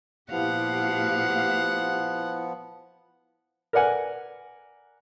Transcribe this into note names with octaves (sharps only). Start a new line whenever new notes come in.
A#2 F3 B3 E4 G4 F5 F#5
A#4 B4 D5 F#5 G#5